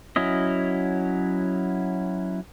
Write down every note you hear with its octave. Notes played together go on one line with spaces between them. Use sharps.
F#3 C#4 E4 D#5